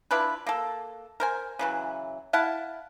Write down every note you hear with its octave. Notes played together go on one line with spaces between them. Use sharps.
D4 E4 F4 B4
A#3 A4
A#4 C5 G#5
C#3 E3 F#3
E4 F5 F#5 A5